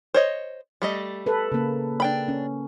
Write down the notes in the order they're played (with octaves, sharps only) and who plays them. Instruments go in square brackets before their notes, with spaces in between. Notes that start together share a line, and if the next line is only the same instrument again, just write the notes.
[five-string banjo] C5 C#5 D#5
G3 A3 D#5
[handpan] A4 B4
C#3 A#3
[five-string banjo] D4 G5 B5
[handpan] C#4